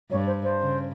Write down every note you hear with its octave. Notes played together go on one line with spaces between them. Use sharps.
G2 C#5
C5
C5
C#3